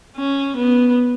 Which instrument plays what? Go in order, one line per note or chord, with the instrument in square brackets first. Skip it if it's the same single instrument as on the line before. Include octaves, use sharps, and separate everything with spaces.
[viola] C#4
B3